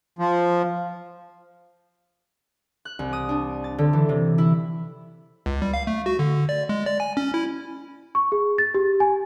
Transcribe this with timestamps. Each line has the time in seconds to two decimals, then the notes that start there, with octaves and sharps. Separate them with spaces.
0.19 F3
2.85 F#6
2.99 C2
3.13 D#6
3.29 D4
3.64 A6
3.78 D3
3.93 E3
4.09 C3
4.38 E4
5.46 C#2
5.62 G3
5.74 F5
5.87 A3
6.06 F#4
6.19 D3
6.49 D5
6.69 G#3
6.86 D5
7.00 G#5
7.17 C#4
7.34 E4
8.15 C#6
8.32 G#4
8.58 A6
8.74 G4
9.00 G#5